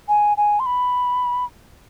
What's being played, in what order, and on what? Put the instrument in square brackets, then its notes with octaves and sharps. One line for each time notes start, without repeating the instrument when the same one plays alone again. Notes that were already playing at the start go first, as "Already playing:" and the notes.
[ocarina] G#5
G#5
C6
B5